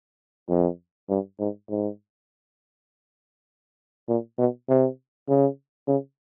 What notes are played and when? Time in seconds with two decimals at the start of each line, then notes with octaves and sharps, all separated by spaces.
0.49 F2
1.09 G2
1.39 G#2
1.70 G#2
4.08 A#2
4.38 B2
4.69 C3
5.28 C#3
5.88 C#3